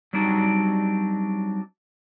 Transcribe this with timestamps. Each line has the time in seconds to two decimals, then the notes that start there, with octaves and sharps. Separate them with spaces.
0.13 F#3 G3 C4 D4 D#4 F#4